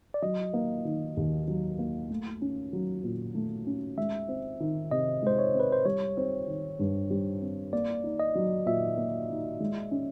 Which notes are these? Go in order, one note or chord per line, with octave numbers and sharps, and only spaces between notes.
D5
F#3 D#5
A#3
D#3
D#2
F#3
A#3
A3
C#4
F#3
A#2
A3
C#4
G#3 E5
C4
D#3
C3 D#5
G#3 C5
C#5
C4
B4
C5
G3 C#5
C4
D#3
G2
G3
C4
A#3 D5
D#4
D#5
F#3
A#2 E5
A#3
D#4
G#3
C#4